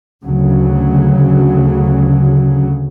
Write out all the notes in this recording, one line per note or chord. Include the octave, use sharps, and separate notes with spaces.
D2 C#3 F#3